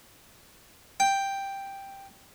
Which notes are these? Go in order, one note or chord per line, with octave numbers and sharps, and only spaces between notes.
G5